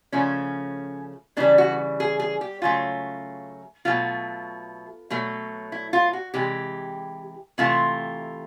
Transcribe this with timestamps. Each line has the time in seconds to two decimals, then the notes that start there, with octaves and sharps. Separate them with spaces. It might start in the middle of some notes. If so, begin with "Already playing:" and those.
0.12 C#3 F3 A3 C#4
1.37 C#3 E3 G3 D4
1.58 F#4
2.00 G#4
2.20 G#4
2.41 G4
2.62 C#3 F#3 A3 F4
3.85 B2 F#3 A3 F4
5.10 B2 F#3 A3
5.72 E4
5.93 F4
6.13 F#4
6.34 C3 E3 G#3 G4
7.58 C3 E3 A3 F4